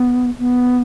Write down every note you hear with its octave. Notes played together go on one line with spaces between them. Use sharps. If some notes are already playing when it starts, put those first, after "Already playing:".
Already playing: B3
B3